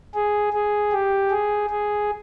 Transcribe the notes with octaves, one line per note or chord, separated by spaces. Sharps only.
G#4
G#4
G4
G#4
G#4